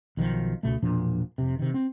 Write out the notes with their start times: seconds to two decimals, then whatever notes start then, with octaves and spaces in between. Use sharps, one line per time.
0.17 B1 D#3 F3
0.63 C#2 B2 A3
0.82 E1 A#2 F3 D4
1.38 F1 C3
1.59 C3 D#3
1.74 C4